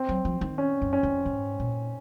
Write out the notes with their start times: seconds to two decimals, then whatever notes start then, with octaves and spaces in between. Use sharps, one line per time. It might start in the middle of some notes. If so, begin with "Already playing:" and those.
Already playing: C4
0.09 F#3
0.25 F3
0.41 D#3
0.58 C#4
0.82 F#2
0.93 C#4
1.03 F2
1.26 G#2
1.60 A#2